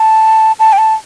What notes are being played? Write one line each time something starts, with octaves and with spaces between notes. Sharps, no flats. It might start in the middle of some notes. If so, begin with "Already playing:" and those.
Already playing: A5
A5
G5
A5